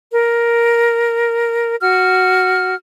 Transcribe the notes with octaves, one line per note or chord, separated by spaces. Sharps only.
A#4
F#4 F6